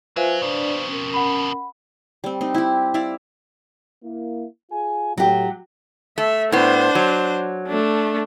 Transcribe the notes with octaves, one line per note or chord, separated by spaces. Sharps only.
F#3 F4 B4 C5 E5 F5 G#5
F2 B2 D4 D5
C#4 A#4
F#5 B5
G3 C4
C4 D#4
E4 G4
E4 D5 E5 F5
A#3 E4
F4 G#4 G#5
A2 F#3 G4
A3 E5
A2 B3 D4 C5
F#3
A3 D4